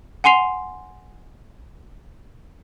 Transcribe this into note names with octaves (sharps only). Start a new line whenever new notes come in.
F#5 G#5 C6 C7 F7